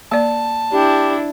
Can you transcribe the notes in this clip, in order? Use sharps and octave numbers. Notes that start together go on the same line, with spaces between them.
A#3 D5 A5
D4 E4 G4